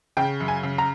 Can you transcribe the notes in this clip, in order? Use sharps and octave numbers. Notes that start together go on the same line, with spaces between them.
C#3 G5
F#2
G#5
C#3
A#5